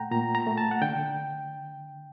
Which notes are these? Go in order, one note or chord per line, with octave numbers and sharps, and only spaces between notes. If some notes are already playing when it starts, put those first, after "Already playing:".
Already playing: A#2 A3 F#5 G5 A#5
A#2 A#5
A#5
A3
A5
F#5
D3 G5